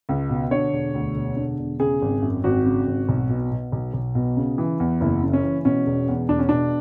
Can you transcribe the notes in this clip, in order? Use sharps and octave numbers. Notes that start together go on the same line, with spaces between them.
C#2
B2
D3 C#5
E1
D2
E1
D3
E1
C#3 G#4
G#1
F#2
G#1 F#4
C#3
G#1
B1
B2
B2
B1
B1
B2
C#3
E3
E2
F#1 E4
C#3
C#4
E3
B2 C#4
E1
E2
E1 D4
C#4
B2 D4